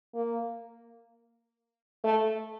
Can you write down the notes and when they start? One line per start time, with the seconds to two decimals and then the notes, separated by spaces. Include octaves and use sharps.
0.15 A#3
2.04 A3